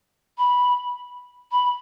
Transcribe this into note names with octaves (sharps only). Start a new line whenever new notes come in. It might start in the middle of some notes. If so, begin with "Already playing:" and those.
B5
B5